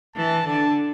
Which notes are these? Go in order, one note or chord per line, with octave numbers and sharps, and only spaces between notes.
E3 A5
D3 A5